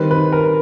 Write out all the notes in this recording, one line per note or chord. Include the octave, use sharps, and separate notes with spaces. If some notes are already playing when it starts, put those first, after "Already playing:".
Already playing: D#3 G3 C4 B4
B4
A#4